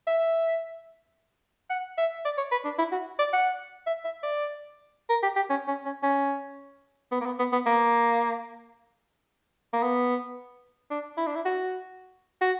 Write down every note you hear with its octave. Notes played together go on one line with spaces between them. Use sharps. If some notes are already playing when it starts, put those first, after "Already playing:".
E5
F#5
E5
D5
C#5
B4
D4
E4
F#4
D5
F#5
E5
E5
D5
A#4
G4
G4
C#4
C#4
C#4
C#4
B3
A#3
B3
B3
B3
A#3
A#3
B3
D4
E4
D4
E4
F#4
F#4